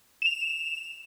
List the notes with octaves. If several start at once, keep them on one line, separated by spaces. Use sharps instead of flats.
E7 F7